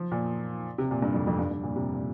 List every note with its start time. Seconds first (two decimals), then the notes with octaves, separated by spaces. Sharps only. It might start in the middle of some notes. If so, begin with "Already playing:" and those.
Already playing: F3
0.12 A#2
0.78 C3
0.91 A#2
1.02 G2
1.14 F2
1.27 F2
1.39 G2
1.51 G2
1.63 A#2
1.76 C3
1.94 A#2